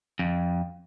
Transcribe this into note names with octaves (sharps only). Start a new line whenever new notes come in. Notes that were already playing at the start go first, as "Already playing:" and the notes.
F2